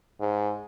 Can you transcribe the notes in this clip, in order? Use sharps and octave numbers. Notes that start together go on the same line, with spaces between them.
G#2